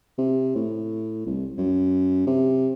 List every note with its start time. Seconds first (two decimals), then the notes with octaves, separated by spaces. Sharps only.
0.18 C3
0.55 A2
1.26 C2
1.58 F#2
2.27 C3